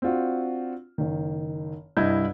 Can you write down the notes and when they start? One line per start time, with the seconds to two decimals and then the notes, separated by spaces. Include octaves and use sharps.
0.02 C4 D4 F4 F#4
0.98 F#1 D#3
1.97 C2 G2 E4 D#5 G6 G#6